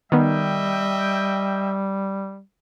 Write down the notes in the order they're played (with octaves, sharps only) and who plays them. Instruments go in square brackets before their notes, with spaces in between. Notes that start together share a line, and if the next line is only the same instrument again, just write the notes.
[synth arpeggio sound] D#3 B3 [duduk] G3 [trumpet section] D#5 E5 G5